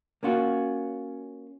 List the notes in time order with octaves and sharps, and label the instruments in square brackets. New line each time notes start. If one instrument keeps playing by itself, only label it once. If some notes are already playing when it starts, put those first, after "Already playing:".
[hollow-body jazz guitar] A#3 C#4 F4 F#4